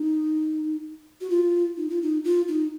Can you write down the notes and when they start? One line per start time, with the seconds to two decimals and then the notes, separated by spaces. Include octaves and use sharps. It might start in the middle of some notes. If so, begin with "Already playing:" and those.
Already playing: D#4
1.21 F#4
1.30 F4
1.77 D#4
1.90 F4
2.02 D#4
2.24 F4
2.48 D#4